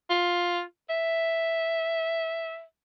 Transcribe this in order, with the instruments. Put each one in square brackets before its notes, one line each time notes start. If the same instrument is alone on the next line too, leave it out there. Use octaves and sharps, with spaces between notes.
[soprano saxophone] F4
E5